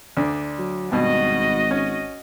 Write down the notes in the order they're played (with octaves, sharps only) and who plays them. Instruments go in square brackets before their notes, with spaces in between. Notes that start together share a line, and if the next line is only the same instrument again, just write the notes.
[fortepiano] D2 D4
[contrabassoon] F#3
[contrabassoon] G#1 [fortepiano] G2 B2 [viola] F#4 D#5
[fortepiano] C#4